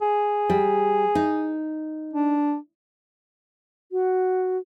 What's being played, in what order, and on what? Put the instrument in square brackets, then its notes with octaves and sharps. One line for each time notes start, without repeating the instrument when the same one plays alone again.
[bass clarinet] G#4
[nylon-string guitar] G3
D#4
[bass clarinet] D4
[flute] F#4